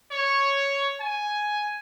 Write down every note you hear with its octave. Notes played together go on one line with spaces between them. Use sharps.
C#5
G#5